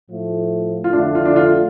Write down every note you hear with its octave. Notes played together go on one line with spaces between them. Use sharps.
A2 F3 A3
F4
F2 D3 A3 D4
F4
D4
F4